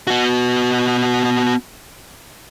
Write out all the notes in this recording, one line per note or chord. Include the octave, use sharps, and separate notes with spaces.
B3 F#4